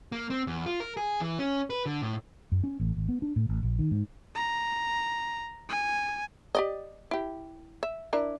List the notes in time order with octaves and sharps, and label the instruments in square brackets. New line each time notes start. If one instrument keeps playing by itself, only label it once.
[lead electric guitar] A#3
C4
E2
F4
A#4
G#4
E3
C#4
B4
D3
A2
[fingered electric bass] F#2
C#4
A1
G#1
B3
D4
A2
A1
A#1
D#3
G#2
[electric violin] A#5
G#5
[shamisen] G4 D5 D#5
E4 G4
E5
D4 E4 A#4